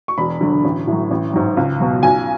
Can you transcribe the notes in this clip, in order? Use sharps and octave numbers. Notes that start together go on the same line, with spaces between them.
C#6
E1 B5
D2 D3 F#3
A1
A2 F#3
A1
G#2 F#3
C#2
B2 F#3
B1 G#5